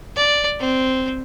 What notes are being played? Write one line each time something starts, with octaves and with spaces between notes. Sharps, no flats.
D5
C4